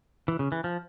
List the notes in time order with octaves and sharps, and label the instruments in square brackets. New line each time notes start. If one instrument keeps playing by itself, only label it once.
[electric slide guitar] E3
C#3
E3
F3